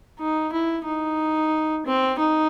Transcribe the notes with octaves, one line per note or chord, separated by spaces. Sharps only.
D#4
E4
D#4
C4
D#4